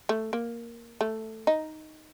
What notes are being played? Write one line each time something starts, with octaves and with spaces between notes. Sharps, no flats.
A3
A#3
A3
D#4